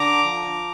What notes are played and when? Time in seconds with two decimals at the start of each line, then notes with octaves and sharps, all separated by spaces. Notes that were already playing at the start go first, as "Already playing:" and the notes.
Already playing: D3 A#5 D6
0.24 F3